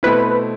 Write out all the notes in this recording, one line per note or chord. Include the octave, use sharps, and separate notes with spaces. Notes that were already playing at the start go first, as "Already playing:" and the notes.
B2 A3 C4 E4 B4